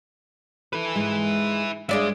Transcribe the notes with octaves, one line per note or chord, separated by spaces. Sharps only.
E4 A4 B4
G#2 G#3
G2 G#3 G#4 D5 E5